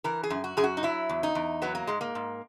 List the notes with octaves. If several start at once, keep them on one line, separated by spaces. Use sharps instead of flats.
E3 A#4
G#4
F#2
F#4
F#2 G#4
F#4
D#4
F#3 E4
E2
D#4
E2
F#3 B3
A#3
G#2 G#3
A#3
G#2